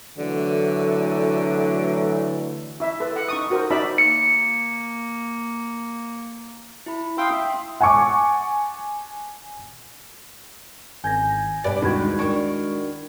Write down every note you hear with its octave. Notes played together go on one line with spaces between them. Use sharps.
D3 E3 F#3 A3
E4 E5
A4 B4
F#5
D#4 C#6 D#6
F4 F#4 A#4 C5
D#4 F#4 D5 E5 A5 B5
A#3 C#7
E4 B5
F5 G5 C6 D#6 E6
E5
C6
F#5 G#5 A5 C#6 D6
G#1 G#5 G6 G#6 A#6
G2 B2 G4 B4 D5
D#2 G#3 E4 F#4 B5 G#6
D#3 D4 C#6